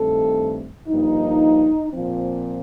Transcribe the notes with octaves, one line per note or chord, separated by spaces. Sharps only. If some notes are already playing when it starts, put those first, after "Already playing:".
Already playing: G2 D#3 A3 C4 A4
G2 F3 A#3 D#4
A#2 F3 C4